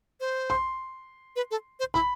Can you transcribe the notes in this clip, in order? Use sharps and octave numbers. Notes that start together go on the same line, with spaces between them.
C5
C6
B4
A4
C5
E4 B5